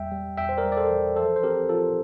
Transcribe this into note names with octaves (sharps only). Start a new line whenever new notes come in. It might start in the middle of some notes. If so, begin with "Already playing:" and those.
Already playing: E2 G3 E5 G5
G3
E2 E5 G5
C5
A#4 D5
G3
D5
A4 C5
E3
F3 A4 C5
C5
C4 G4 A#4
F3 F4 A4